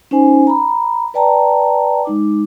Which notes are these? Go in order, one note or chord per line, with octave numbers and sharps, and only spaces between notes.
C#4 D#4 C5 G#5
A#5 B5
B4 D5 G5 A5 A#5
G#3 D#4 D6